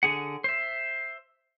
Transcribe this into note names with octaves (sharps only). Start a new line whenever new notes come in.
D3 G#4 F#5
C5 E5